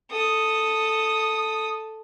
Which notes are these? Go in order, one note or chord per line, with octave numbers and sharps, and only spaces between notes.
A4 D#6